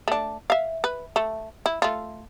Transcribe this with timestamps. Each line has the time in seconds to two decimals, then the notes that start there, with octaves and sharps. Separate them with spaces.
0.08 A3 D4
0.50 E5 F5
0.84 B4
1.16 A3
1.66 E4
1.82 A3 F4